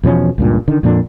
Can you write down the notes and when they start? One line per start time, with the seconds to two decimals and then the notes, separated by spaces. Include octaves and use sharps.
0.03 E2 B2 F3 C#4
0.38 C#2 G2 A#2
0.68 D3 D#3
0.83 F2 A#2 D3 D4